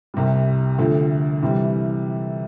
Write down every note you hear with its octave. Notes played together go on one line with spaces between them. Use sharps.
C2 C3 G3
D2 D3 F3
C3 E3 G3